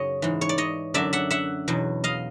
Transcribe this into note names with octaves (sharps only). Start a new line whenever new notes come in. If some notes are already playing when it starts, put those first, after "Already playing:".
Already playing: F#2 C#3 F#3 C#5 D#5
G#2 E3
C#5
D5
C#5 D#5
F#2 D3 F#3 D5 E5
E5 F#5
E5 F#5
E2 B2 F#3
D#5 F5